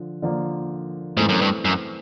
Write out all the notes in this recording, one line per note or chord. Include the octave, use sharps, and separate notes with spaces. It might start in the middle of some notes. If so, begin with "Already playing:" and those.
Already playing: D3 F3
D3 F3 A#3
G#2 E3 A3 C4
F#2
G2
F#2